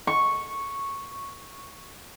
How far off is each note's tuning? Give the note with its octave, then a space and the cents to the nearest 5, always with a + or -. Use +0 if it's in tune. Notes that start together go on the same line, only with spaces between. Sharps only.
C#6 -5